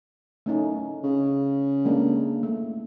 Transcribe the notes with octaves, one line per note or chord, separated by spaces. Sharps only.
A3 C#4 D#4
C#3
G#3 A#3 D4
A3